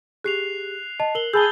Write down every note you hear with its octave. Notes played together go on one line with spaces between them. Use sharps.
G4 G#4 F#6 C7 F7
D#5 A5
A#4 F#7 G7
G#4 A5 B5 E6 G6 A6 G7